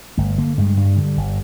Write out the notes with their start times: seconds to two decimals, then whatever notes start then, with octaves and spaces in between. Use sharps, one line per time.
0.17 G1 A3
0.38 D3 A#3
0.58 G2 G#3
0.77 G2 G3
0.97 D3
1.17 G1